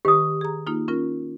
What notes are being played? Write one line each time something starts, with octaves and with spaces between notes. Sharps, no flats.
D#3 G4 B4 D#6
G#4 A#5
A#3 D#4 F4
C#4 F4 A#4